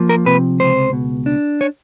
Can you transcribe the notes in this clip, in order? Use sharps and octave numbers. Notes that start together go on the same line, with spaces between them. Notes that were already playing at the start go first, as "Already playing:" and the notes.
Already playing: F3 A#3
A#4
C3 B4
C#2 C5
B2
D4
C#5